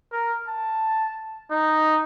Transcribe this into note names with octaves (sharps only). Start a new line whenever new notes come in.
A#4
A5
D#4